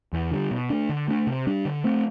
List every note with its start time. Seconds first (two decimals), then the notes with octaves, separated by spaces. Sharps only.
0.13 E2
0.31 D3 G3
0.51 B2
0.70 A3 D4
0.89 D3
1.08 A3 D4
1.27 C3
1.47 G3 D4
1.65 D3
1.84 A3 C4